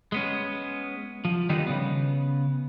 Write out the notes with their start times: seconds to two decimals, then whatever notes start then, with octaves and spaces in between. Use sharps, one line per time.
0.12 G#3 B3 C#4
1.25 F3
1.49 D3 D#3 G3 B3 D#4
1.67 C#3 B3